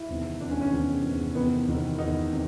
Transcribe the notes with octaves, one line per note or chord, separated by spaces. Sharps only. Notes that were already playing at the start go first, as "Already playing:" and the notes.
Already playing: E4
E2 C3 D#3
E2 C3 D#3 D4
C#4
C#4
E2 C3 D#3
E2 C3 D#3
E2 C3 D#3 B3
E2 C3 D#3
E2 C3 D#3 D#4
C3 D#3